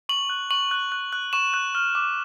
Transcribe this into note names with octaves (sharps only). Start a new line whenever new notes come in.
C#6 F#7
F#6
C#6 F#7
F#6
F#6
F#6
C#6 E7
F#6
F6
D6